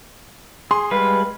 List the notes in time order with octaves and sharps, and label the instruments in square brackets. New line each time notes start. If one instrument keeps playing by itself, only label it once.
[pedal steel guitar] G#4 [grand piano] C6
[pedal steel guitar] G3 G#3 F5 [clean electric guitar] B4